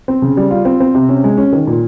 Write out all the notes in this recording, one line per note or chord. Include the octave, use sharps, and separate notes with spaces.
C4
C#3
G3
F4
C4
C4
C3
C#4
G#3
C#4
D#3
A#2